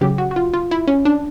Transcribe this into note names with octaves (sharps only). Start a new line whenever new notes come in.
C#3 F#3 G4
F#4
F#4
F4
F4
E4
C#4
D4